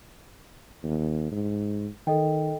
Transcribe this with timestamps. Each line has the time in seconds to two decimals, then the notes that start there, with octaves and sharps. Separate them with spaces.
0.84 D#2
1.32 G#2
2.07 D#3 A4 D#5 G5